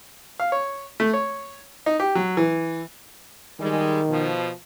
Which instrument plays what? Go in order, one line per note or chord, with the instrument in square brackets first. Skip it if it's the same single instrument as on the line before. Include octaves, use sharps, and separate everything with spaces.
[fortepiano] F5
C#5
A3
C#5
D#4
G4
F#3
E3
[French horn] D#3 [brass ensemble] G3 G#3
[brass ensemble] B2 F3